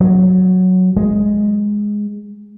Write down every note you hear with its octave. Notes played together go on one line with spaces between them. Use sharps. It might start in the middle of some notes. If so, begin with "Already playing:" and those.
F#3
G#3